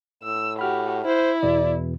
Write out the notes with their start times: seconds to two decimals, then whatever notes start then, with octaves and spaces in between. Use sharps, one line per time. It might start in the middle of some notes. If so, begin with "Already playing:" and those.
0.23 A2 E6
0.59 F#4 G4 B5 F6
1.05 E4 C5
1.43 E2 B2 E3 D5